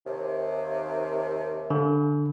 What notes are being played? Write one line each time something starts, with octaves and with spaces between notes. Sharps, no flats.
D#2 C3
D3